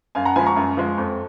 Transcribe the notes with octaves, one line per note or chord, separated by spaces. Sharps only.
F#2 F5 G#5
F#5 A#5
F3 G#3 G#5 B5
A#5 C#6
F#2
F3 G#3
F2